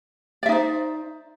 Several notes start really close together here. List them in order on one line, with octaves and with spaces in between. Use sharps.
D5 E5 D#4 C5